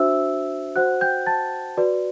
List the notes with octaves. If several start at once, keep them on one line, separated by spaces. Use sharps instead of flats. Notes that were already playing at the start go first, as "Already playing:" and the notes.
Already playing: D4 F#4 C5 E5 E6
F#4 C5 F#5 F#6
G5 G6
A5 A6
F#4 B4 D5